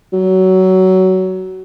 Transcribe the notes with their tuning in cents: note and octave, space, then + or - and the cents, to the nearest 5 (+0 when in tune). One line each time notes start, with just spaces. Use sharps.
F#3 +20